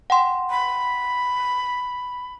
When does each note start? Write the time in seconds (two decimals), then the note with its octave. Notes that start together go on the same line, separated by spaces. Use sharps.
0.10 F#5 G5 C6
0.50 B5